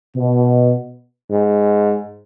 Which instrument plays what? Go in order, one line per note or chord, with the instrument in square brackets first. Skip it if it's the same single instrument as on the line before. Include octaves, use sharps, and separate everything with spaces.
[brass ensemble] B2
[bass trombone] G#2